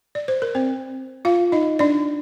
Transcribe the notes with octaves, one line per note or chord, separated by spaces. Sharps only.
D5
C5
A#4
C4 C5
F4 F5
D#4 D#5
D4 D5